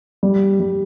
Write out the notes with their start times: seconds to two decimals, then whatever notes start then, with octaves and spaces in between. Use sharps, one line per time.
0.23 G3
0.60 G3